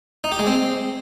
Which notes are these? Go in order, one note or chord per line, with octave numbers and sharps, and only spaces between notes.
D#4
G4
G#3
C4